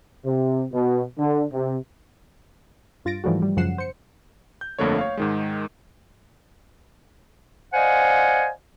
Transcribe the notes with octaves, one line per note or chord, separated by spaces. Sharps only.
C3
B2
D3
C3
G2 F4 A6 A#6 D7
G#2 E3 F3 G3 A3 F#4
G3
F#2 C#3 F3 F#5 C7 E7
C5 C#7
G6
G1 F2 D3 A3 A#3 C#5
C#5 F5
G#2 D#3 G#3
C5 D5 D#5 F5 F#5 G#5